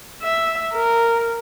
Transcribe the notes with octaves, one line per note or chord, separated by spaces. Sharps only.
E5
A#4